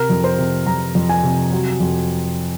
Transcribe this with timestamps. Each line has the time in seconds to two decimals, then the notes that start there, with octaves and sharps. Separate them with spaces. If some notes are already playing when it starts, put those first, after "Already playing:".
Already playing: C3 A#4
0.10 F2
0.24 C5
0.39 C3
0.67 F2 A#5
0.95 F2
1.09 G#5
1.23 C3
1.52 F#3
1.80 F2